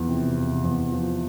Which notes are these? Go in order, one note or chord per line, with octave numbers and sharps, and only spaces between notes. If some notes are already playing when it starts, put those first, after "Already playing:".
Already playing: E2 F3
C3
C3
E2
F3